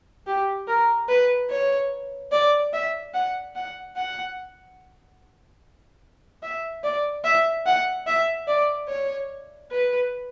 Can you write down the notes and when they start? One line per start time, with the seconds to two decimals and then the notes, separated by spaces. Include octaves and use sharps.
0.27 G4
0.68 A#4
1.08 B4
1.50 C#5
2.32 D5
2.73 E5
3.14 F#5
3.55 F#5
3.96 F#5
6.42 E5
6.84 D5
7.24 E5
7.66 F#5
8.07 E5
8.47 D5
8.89 C#5
9.71 B4